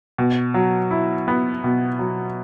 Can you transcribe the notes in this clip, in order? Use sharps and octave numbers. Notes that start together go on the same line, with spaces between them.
B2
F#3
E4
B3
B2
F#3